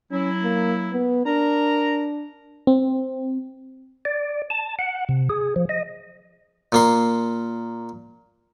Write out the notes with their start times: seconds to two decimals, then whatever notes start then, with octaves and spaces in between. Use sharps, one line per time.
0.11 F#3 C#4 E4
0.43 A#3
0.92 B3
1.26 D4 A#4 A#5
2.67 C4
4.05 D5
4.50 A5
4.79 F#5
5.09 C3
5.30 G#4
5.56 F3
5.69 D#5
6.72 A#2 A#3 C6